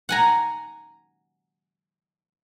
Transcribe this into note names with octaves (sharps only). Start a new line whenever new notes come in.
F#5 G#5 A#5